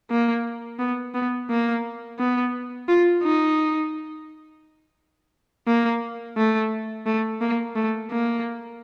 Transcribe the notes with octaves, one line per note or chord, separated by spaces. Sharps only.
A#3
B3
B3
A#3
B3
F4
D#4
A#3
A3
A3
A#3
A3
A#3